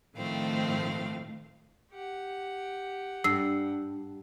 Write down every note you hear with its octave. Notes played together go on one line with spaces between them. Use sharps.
A2 D#3 F3 A3 C4 F5
G4 F#5
G2 E6 C7